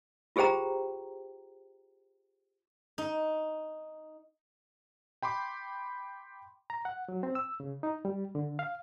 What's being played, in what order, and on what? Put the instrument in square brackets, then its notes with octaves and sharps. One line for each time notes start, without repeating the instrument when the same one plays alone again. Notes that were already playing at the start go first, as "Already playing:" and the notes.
[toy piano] F4 G4 G#4 C5 G5 A#5
[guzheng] D#4
[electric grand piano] G5 B5 C6 D6
[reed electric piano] A#5
F#5
F#3
C4
E6
C#3
D#4
G3
D3
F5